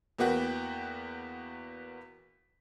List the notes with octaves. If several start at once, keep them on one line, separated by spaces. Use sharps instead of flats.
E2 A#3 B3 F#4 G5